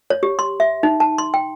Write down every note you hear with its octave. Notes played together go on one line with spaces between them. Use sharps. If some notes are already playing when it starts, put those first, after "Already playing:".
C#5
G4
C6
E5
D#4
A5
C6
G5